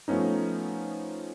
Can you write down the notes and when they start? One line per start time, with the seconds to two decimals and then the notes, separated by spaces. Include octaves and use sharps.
0.08 F3 A3 B3 C#4 D#4